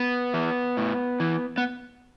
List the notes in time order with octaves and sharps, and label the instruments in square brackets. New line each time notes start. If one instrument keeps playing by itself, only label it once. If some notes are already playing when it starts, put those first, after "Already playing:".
Already playing: [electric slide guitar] B3
E3
A2
E3
B3